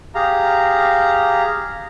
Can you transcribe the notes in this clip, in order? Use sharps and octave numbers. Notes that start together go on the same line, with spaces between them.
G4 G#4 F5 A#5